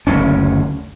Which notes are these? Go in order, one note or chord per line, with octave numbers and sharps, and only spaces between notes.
F#1 D2 C#4